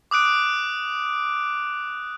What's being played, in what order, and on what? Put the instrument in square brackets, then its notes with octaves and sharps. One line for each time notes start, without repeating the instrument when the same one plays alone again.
[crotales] D6 D#6 F#6 D7